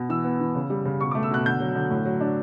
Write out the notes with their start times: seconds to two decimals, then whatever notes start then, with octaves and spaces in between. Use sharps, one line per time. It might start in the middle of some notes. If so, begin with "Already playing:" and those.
Already playing: B2
0.09 E3 E6
0.24 B3
0.40 E3
0.55 C#3
0.70 G3
0.85 C#3
1.00 B2 C#6
1.11 D6
1.15 A3
1.23 E6
1.31 B2 F#6
1.45 D3 G6
1.60 F#3
1.75 D3
1.90 A2
2.05 F#3
2.21 D4